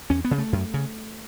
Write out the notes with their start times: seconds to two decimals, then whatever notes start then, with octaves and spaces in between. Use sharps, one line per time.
0.10 E2 C#4
0.25 B3
0.31 C#3
0.38 A3
0.53 F#2
0.74 C#3